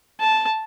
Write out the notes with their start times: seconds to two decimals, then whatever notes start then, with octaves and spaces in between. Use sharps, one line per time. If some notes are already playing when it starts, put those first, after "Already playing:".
0.20 A5